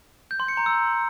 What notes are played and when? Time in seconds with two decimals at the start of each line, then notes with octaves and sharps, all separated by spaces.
0.31 G6
0.40 C6
0.48 C#7
0.57 A#5
0.66 E6